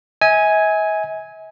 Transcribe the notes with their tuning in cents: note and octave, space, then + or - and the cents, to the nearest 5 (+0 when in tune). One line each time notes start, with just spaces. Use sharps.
E5 -45 G#5 +0